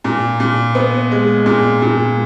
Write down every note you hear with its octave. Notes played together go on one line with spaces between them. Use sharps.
A#2
A#2
B3
G#3
A#2
A#2